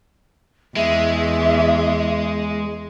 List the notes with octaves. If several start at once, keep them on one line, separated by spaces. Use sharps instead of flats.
E2 G#3 E5